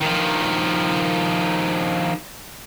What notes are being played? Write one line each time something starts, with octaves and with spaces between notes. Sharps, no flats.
D#3 F3